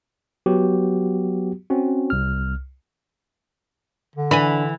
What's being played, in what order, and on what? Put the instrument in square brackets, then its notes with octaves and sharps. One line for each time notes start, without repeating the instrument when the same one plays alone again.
[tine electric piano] F#3 B3 F#4 G4
C4 C#4 F#4
C2 F6
[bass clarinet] D3
[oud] E3 [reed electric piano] D4 [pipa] G#5 B5